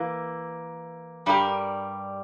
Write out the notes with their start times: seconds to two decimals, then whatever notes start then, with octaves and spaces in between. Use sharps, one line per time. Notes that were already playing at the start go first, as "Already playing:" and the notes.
Already playing: E3 A#3
1.26 G2 G3 C#4 G4 A#4